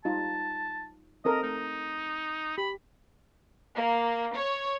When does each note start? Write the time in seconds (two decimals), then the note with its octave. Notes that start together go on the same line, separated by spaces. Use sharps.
0.05 G3 D#4 F4 A5
1.25 C4 A4 A#4 D#5
1.43 A3 D#4
2.58 G4 B5
3.77 A#3
4.34 C#5